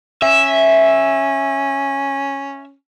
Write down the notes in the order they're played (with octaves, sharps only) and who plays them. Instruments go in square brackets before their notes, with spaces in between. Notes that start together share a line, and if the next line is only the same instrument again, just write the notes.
[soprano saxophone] C#4 [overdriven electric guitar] E5